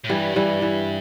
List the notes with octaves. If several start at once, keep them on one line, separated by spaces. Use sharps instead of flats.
A2
G2 E3 G3
E3 G3
E3